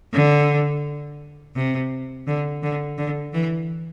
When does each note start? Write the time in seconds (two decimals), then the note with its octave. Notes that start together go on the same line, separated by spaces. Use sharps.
0.14 D3
1.56 C3
2.27 D3
2.63 D3
2.98 D3
3.34 E3